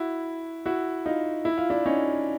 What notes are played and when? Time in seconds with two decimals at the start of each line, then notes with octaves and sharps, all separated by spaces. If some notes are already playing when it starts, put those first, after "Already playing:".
Already playing: E4 F#4
0.66 E4 F#4
1.05 D#4 F4
1.45 E4
1.58 F4
1.70 D4 E4
1.86 C#4 D#4